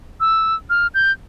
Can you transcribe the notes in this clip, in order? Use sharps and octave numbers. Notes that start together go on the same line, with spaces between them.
E6
F6
G6